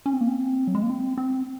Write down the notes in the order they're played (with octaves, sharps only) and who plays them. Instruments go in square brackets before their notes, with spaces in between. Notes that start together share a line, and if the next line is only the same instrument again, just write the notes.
[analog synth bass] C#4
C4
A#3
C4
F#3
G#3
A#3
C4
C4